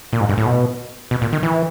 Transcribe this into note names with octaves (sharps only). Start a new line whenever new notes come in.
A#2
G#2
G2
A2
B2
B2
A#2
D#3
E3